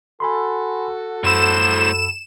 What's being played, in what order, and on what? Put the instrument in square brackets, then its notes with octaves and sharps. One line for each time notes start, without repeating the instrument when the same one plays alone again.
[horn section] F#4 A4 [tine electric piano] G#5 B5 C6
[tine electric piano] F#2 B5 E6 [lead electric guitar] A2 C5 [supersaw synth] E7